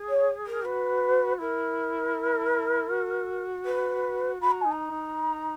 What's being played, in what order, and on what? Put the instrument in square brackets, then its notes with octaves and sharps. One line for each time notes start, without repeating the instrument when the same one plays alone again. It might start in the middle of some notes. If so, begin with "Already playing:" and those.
Already playing: [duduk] G#4
[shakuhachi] C#5
A#4
[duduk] F#4 [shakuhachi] B4
[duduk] E4 [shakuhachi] A#4
[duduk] F#4
[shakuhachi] B4
[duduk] F#4 [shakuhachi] B5
[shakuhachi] A#5
[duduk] D#4 [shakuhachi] G#5
[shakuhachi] A#5
[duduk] D#4